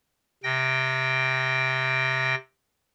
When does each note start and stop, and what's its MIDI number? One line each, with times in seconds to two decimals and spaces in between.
0.43 2.35 48
0.43 2.35 79
0.43 2.35 94